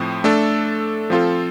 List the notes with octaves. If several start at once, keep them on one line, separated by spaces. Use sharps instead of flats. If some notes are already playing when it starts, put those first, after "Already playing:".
Already playing: A2 F3 C4
A3 D4 A4
F3 C4 F4 A4